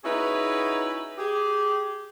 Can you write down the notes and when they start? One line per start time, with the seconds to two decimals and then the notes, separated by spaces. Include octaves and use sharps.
0.04 C#4 D#4 E4 F#4 G#4 B4
1.18 G4 G#4